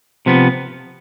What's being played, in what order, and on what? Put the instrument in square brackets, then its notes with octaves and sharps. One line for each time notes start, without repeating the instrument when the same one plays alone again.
[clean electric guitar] C3 F3 B3